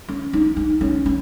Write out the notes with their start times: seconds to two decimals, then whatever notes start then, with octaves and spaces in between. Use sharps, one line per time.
0.08 C#4
0.33 D#4
0.57 D#4
0.81 C#4
1.06 C#4